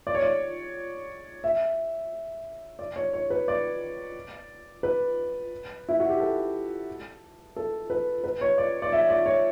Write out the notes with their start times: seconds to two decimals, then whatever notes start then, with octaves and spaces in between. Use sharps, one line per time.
0.07 D5
0.15 C#5
0.22 D5
1.44 E5
2.79 D5
2.96 C#5
3.13 C#5
3.30 B4
3.48 D5
4.83 B4
5.89 E4
6.00 F#4
6.09 G4
6.20 A4
7.56 A4
7.90 B4
8.24 B4
8.41 C#5
8.58 D5
8.82 D5
8.93 E5
9.09 D5
9.26 C#5